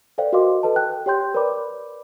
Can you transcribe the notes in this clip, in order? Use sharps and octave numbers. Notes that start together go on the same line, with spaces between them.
A4 B4 C5 D5 F5 G5
F#4 A#4 D#5 F5 C6 D6
A4 B4 D#5 A5
G5 F#6
G4 C#5 G5 C6 G6
A#4 B4 C#5 D5 B5 D6